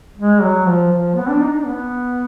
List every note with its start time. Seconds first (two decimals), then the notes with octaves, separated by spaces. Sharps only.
0.18 G#3
0.42 F#3
0.66 F3
0.92 F3
1.16 B3
1.29 D4
1.41 D#4
1.53 D4
1.65 B3